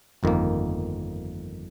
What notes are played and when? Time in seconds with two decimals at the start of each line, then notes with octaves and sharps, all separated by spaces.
0.23 G1 F2 D#3 A#3